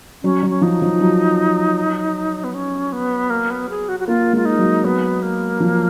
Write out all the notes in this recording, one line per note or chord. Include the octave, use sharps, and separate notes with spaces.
F#3 C#4
F#3
C#4
F3 D#4
F3
F#3
B3
C#4
B3
A#3
B3
G#4
F#4
F#4
A#3 F4
G#3 F4
D#4
F#3
F#3 B3
A#3
F3